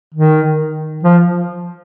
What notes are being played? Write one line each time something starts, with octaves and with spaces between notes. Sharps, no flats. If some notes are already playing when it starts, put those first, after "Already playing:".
D#3
F3